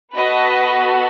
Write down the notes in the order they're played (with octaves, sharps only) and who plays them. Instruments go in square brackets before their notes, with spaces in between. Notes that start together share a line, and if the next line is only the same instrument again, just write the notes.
[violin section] B3 F#4 A4 B4 D#5